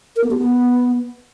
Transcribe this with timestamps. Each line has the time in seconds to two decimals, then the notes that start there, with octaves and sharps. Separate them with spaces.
0.16 A#4
0.24 B3
0.31 G4
0.38 B3